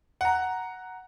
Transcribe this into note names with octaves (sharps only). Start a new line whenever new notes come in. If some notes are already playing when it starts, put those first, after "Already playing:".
F#5 A#5